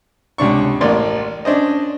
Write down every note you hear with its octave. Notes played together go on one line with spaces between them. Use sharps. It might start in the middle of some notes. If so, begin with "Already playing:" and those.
C#2 C3 D4 C#6
A1 A#3 D5 C6
C#4 D4 C5 D#5